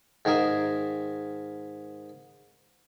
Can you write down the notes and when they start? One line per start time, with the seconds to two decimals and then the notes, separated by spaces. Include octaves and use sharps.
0.25 G#2 D#3 G#4 A#4 E5